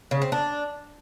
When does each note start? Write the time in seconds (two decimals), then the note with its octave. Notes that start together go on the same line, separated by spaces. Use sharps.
0.11 C#3
0.22 C4
0.32 D4